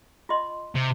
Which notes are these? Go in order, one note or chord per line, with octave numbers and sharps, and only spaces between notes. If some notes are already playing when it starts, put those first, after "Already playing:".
F4 D#5 C6
C3